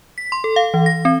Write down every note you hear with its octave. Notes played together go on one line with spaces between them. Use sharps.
B6
C6
A4
F5
E3
A#6
C4